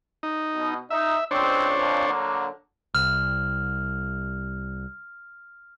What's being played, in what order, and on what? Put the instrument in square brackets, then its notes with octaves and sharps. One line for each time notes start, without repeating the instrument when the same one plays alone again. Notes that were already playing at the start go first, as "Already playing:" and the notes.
[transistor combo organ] D#4
[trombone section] B2
[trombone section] D#4 [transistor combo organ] E5
[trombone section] C#2 C4 [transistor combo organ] D4 C5 C#5
[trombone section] F2 A#2 F3
D3 F#3 A#3
[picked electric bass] C2 [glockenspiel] F6